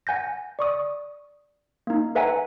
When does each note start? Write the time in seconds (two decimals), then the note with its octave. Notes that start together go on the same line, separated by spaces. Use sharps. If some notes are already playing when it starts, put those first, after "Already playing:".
0.07 F#5 G#5 G6 A#6
0.59 D5 C#6 D#6
1.87 A#3 D#4
2.15 A4 B4 E5 F#5 G#5 A#5